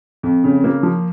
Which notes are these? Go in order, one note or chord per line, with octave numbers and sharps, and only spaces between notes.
F2
C#3
A#3
F3